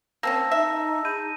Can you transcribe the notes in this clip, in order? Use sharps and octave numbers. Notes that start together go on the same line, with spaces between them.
A#3 C4 C#4 A5 E6 A#6
D#4 E5
G#4 B5 G6 D#7